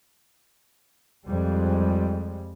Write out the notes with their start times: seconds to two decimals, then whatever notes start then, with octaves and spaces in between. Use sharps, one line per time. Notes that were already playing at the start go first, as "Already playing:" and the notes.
1.26 F2 G3 G#3